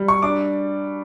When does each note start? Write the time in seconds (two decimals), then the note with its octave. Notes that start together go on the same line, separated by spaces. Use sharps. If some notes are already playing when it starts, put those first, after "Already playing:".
Already playing: G3
0.08 C#6
0.22 D4 D6